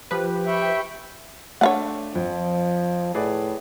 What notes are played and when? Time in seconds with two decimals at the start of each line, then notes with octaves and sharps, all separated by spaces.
0.11 F3 G4 B4
0.46 E5 G5 B5 C#6
1.61 A3 D4 C#5 F5 F#5
2.15 F2 F3
3.15 A2 G#4 B4 D5